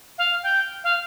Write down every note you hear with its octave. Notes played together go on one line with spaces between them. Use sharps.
F5
G5
F5